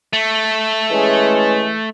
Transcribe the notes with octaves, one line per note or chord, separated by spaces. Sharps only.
A3
E3 G#3 C#4 G#4